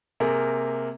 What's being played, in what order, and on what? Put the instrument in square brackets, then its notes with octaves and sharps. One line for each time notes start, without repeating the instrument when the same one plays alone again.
[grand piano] C3 A#3 G#4 A#4